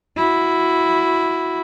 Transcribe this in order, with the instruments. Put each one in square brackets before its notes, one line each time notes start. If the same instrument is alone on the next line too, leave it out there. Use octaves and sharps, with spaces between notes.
[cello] E4 F#4